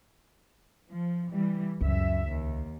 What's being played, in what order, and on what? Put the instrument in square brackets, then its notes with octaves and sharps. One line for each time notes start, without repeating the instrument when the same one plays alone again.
[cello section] F3
E3 G3
[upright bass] C#2 [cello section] F#2 E5
[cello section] D#2